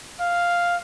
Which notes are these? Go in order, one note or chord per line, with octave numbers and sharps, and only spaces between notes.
F5